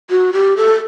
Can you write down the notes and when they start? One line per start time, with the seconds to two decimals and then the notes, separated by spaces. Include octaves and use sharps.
0.10 F#4
0.33 G4
0.57 A4